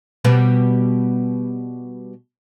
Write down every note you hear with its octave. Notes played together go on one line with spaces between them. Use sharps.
B2 G3 B3